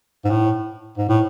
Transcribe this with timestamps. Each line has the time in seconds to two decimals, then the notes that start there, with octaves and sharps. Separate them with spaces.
0.24 G#2
0.30 A2
0.97 G#2
1.09 A2